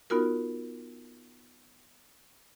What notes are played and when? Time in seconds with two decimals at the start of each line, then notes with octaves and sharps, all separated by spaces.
0.10 B3 D#4 F4 F#4 A#4